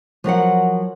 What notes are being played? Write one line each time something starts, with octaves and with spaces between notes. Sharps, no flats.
F3 F#3 A#4 F#5